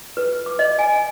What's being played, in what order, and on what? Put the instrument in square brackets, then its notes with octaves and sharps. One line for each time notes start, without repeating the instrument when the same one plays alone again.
[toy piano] B4
D6
D#5
G#5